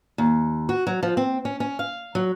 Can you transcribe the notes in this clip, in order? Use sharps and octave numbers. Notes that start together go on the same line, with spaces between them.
D#2
F#4
F#3
F3
C4
C#4
C#4
F5
F#3